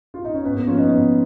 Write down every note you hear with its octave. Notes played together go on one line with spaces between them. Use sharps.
F4
D#4
C#4
G#2 B3
A#3
F3 C#4 F4
B3 D#4
G#2 B3 D#4